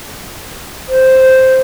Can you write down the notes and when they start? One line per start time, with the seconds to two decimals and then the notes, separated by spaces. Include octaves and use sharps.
0.88 C5